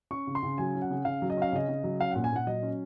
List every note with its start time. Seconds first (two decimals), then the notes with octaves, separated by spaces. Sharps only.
0.11 C#4 C#6
0.27 C#3
0.35 C6
0.43 C#3
0.58 F#3 G#5
0.75 C#4
0.82 F#5
0.90 C#3
1.05 C#3 F5
1.22 F#3
1.30 D#5
1.37 C#4 F5
1.53 C#3 D#5
1.69 C#3
1.84 F#3
2.00 C#4 F5
2.11 A#2 F#5
2.24 G#5
2.32 A#2 F#5
2.47 F#3 D#5
2.63 C#4